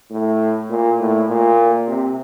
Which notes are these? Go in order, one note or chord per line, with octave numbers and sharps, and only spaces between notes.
A2
A#2
A2
A#2
C3